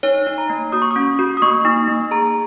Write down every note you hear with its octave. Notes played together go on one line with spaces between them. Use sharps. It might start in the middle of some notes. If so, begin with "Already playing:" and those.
D#4 C#5
D#4
A#5
A#3
F#4 D#6
C#6
D#6
C#4
F#4
D#6
A#3 C#6
D#4
A#3
G#4 A#5